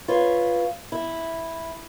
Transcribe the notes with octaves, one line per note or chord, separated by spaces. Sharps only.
F4 B4 C#5
E4